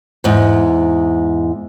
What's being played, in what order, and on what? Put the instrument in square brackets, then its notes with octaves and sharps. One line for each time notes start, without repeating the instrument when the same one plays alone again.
[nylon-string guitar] E2 G#2